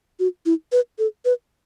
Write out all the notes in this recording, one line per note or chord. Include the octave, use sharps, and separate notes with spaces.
F#4
E4
B4
A4
B4